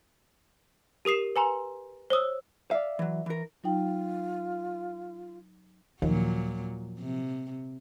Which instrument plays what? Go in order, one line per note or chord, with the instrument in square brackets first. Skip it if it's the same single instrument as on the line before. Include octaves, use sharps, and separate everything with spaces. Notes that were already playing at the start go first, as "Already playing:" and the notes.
[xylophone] G4 A#4 D#6 C7 E7
B4 G#5 A#5 C6
C5 C#5 D#6 E6
[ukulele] D5 E5 [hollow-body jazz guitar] F5
[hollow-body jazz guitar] E3 F#3
E3 A#4
[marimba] F#3 D#4 G5 [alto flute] F4
[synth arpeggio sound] D#2 [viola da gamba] A#2 F#3 [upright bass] F3
[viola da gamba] C3